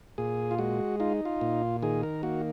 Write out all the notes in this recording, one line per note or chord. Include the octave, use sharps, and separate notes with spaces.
A#2 G#4
F4
G#3 F#4
D#4 F4
F4
A#2
D#3 G#4
A#4
A#3 F#4